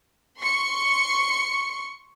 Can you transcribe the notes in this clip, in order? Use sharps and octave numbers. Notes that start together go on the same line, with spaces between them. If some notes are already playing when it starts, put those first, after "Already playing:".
C6 C#6 C#7